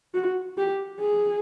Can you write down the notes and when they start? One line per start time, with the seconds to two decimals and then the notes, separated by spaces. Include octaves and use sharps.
0.14 F#4
0.58 G4
1.01 G#4